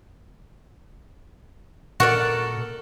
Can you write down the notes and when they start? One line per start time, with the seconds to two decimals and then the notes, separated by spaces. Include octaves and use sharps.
2.00 A#2 F#4 A4 A#4 D5